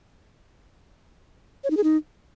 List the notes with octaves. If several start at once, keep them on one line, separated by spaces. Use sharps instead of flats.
C#5
D#4
G#4
D#4